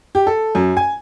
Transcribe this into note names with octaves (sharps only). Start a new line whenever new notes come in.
G4
A4
F#2
G#5